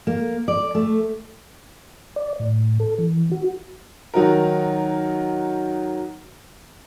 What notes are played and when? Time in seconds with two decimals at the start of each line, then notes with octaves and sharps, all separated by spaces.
0.07 A#3
0.48 D5
0.75 A3
2.16 D5
2.39 A2
2.80 A4
2.99 E3
3.32 F#4
4.14 D#3 F#3 D#4 F#4 A#4